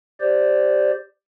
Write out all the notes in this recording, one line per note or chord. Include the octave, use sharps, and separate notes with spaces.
G4 C5 D5